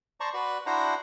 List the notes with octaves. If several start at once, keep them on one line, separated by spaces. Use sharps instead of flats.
C5 D5 A5 A#5 C#6
F#4 B4 D5
D4 E4 F#4 C5 F#5 A#5